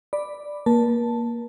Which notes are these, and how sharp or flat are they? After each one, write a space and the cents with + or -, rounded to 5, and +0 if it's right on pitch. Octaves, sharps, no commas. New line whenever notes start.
D5 +5 B5 +0
A#3 +5 A#4 +45 A5 +0